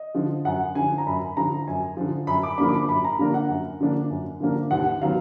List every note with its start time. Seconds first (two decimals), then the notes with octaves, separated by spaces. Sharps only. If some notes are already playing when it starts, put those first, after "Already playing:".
Already playing: D#5
0.15 D3 F3
0.45 F#2 F#5
0.75 D3 F3 G#5
0.98 A#5
1.07 F#2 B5
1.37 D3 F3 A#5
1.68 F#2 G#5
1.97 D3 F3
2.27 F#2 B5
2.43 D6
2.58 D3 F3 A#3 D4 B5
2.69 D6
2.74 B5
2.88 F#2 B5
3.04 A#5
3.19 D3 F3 A#3 D4
3.34 F#5
3.49 F#2
3.80 D3 F3 A#3 D4
4.10 F#2
4.40 D3 F3 A#3 D4
4.71 D#2 F#5
5.02 D#3 F#3 B3 F5